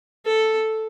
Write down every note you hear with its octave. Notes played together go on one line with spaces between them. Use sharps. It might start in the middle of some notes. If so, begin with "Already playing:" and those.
A4